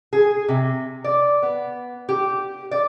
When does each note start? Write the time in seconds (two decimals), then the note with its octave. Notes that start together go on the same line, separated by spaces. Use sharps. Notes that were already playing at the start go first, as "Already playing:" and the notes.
0.13 G#4
0.48 C3
1.04 D5
1.42 B3
2.09 G4
2.71 D5